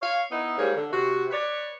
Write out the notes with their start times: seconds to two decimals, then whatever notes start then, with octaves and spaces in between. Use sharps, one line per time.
0.01 C#5 F5
0.30 B3 D#4 E4
0.58 G#2 G3 A#3 C#5
0.75 D3
0.92 C3 F#4
1.31 B4 C#5 D5